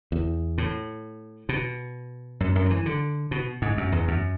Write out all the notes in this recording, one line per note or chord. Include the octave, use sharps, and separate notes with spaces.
E2
A2
B2
F#2
F#2
F#3
E3
D3
B2
G#2
F#2
E2
F#2